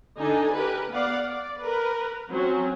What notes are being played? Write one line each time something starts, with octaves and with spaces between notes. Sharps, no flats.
D3 D4 D#4 A4 G#5
G4 A#4 B4
B3 D5 F5 F#5
D5
A#4 B4
F#3 C4 C#4